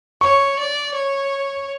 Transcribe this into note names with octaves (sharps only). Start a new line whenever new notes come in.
C#5 C#6
D5
C#5